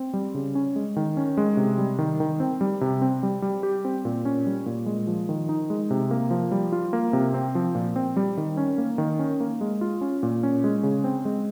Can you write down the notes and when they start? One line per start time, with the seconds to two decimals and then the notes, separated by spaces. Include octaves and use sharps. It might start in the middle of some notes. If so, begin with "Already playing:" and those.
Already playing: C4
0.13 G3
0.34 C#3
0.55 C#4
0.76 G#3
0.96 D#3
1.17 C#4
1.37 G#3
1.57 C3
1.78 G3
1.99 D#3
2.20 D#3
2.40 C4
2.61 G3
2.81 C3
3.02 C4
3.23 G3
3.42 G3
3.63 G4
3.85 C4
4.05 A#2
4.25 C#4
4.46 G3
4.66 A#2
4.86 G#3
5.07 F3
5.29 D#3
5.49 D#4
5.70 G#3
5.91 C3
6.11 A#3
6.30 F3
6.52 G3
6.72 F4
6.93 A#3
7.13 C3
7.34 C4
7.55 F3
7.75 A#2
7.96 C4
8.17 G3
8.37 D#3
8.57 C#4
8.78 A#3
8.98 D#3
9.19 C#4
9.40 A#3
9.61 G#3
9.81 F4
10.01 C#4
10.23 A#2
10.43 C#4
10.64 G#3
10.83 C#3
11.04 C4
11.25 G#3